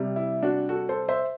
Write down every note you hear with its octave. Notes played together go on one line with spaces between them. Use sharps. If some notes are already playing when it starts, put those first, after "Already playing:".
Already playing: C3 G3
E4
D4 F#4
F#4 A4
A4 C5
C5 E5